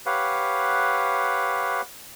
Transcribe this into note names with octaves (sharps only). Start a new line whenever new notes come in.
G4 B4 C#5 F5 F#5